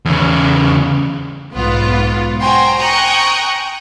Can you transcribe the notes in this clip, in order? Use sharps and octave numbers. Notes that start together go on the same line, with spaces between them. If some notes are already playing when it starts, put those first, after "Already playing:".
E2 C#3
B1 G#2 B3 F4
F#4 C5 G5 G#5 A#5 C6
G5 G#5 A#5 C#6 D#6 F#6